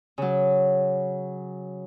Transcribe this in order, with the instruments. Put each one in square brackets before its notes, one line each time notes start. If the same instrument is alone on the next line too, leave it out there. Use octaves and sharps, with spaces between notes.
[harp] C#3 F#3